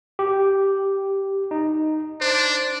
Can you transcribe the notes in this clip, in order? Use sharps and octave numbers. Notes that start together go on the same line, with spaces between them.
G4
D#4
D4 C5